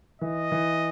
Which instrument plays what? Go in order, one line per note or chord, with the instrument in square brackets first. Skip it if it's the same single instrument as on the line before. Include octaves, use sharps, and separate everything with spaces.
[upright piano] E3 [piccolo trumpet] D#5
[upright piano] E3